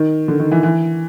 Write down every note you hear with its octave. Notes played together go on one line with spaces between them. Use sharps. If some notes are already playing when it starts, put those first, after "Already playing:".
Already playing: D#3
D3
D#3
E3
E3